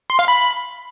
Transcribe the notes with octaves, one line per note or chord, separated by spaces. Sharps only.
C6
F5
B5